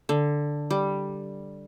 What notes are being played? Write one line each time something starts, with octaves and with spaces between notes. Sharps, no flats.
D3
G3